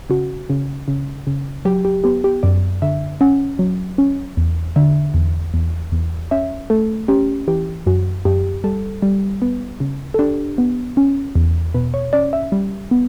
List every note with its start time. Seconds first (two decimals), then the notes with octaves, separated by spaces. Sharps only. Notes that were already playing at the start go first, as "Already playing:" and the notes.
0.10 C#3 F#4
0.50 C#3
0.88 C#3
1.27 C#3
1.65 F#3 G4
1.85 G4
2.04 B3 G4
2.24 G4
2.43 F#2 D5
2.82 D3 E5
3.21 C#4 F#5
3.59 F#3
3.98 C#4
4.37 E2
4.76 D3 E5
5.14 E2
5.54 E2
5.92 E2
6.31 C#4 E5
6.70 A3 A4
7.08 C#4 G4
7.48 E3 G4
7.86 F#2 F#4
8.25 F#2 G4
8.64 G3 A4
9.02 G3
9.42 B3
9.80 C#3
10.14 A4
10.19 D4 G4
10.58 B3
10.97 C#4
11.35 E2
11.74 B2 B4
11.94 C#5
12.13 C#4 D5
12.33 E5
12.52 G3
12.91 B3